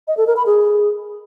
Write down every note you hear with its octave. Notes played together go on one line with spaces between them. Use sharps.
D#5
A4
A#4
B5
G#4